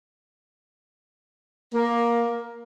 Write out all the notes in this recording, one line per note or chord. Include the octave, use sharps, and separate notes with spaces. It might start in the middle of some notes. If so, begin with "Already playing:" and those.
A#3